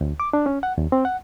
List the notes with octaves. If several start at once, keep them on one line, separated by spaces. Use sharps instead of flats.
D2
D6
D4
C#4
F#5
D#2
C4
F#5